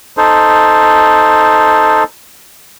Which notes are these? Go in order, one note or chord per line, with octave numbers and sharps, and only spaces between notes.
D#4 A4 C5